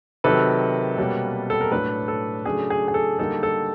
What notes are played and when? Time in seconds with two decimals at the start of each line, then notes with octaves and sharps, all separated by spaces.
0.24 C3 D#3 F#3 A4 B4
0.98 B2 G3 A#3 C#4
1.50 A4
1.61 A#4
1.72 A2 F#3 A3 D4 A4 B4
2.08 A4
2.45 C#3 F#3 A3 D4 G#4
2.70 G#4
2.88 G#4
2.94 A4
3.18 D3 G3 A#3 D#4 A4
3.43 A4